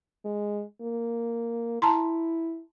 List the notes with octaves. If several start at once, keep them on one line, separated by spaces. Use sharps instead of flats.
G#3
A#3
E4 A5 A#5 C6